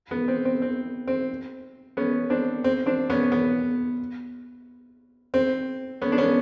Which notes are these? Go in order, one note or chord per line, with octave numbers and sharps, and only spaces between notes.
B3
C4
C4
C4
C4
B3 C#4
C4 D4
C4
C4 D4
B3 C#4
B3
C4
B3 C#4
D4
B3 C#4